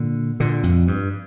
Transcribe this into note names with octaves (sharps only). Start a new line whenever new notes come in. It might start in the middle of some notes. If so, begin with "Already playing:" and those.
Already playing: A#2 D3
A#2 D3
F2
G2